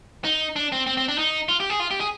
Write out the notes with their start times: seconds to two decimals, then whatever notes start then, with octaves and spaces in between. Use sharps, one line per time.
0.24 D#4
0.56 D4
0.72 C4
0.87 C4
0.97 C4
1.08 D4
1.18 D#4
1.49 F4
1.60 G4
1.70 G#4
1.80 F4
1.91 G4
2.00 G#4